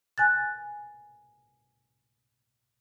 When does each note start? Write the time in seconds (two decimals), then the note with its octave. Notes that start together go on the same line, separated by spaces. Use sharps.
0.18 G#5 F#6 A6